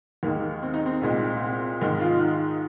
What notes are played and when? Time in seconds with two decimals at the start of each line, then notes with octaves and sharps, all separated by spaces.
0.23 D#2 D#3 G#3 A#3
0.63 C4
0.74 D#4
0.86 C4
1.01 C2 A#2 G#3
1.41 C4
1.81 G#2 D#3 G#3 D#4
2.01 F4
2.20 D#4